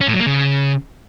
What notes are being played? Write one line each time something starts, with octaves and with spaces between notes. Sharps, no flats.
C#4
A2
F#3
A#3
C#3